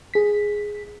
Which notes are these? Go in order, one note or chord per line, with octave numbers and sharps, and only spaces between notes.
G#4 B6